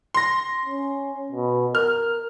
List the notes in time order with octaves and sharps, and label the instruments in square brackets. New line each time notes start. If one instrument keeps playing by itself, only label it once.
[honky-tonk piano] C6 A#6
[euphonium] C#4
B2
[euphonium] A#4 [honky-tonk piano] F6